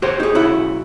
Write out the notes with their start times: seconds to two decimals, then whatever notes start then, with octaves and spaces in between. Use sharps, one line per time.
0.02 F#4 G4 C5 C#5 F#5
0.20 D#4 G#4
0.35 B1 C#4 E4 F#4